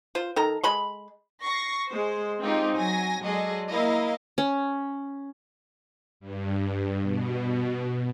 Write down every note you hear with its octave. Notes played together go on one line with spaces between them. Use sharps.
F4 C5
D#3 A4 A#5
G#3 B5 C6
C#6 A#6 C7
G#3 C5
G#3 C4 D#4 F4 G4
F#3 G#5 A#6
F#3 G#3 G#4 A4 D5 D#5
A#3 E4 A#4 D#5 F5
C#4
G2
B2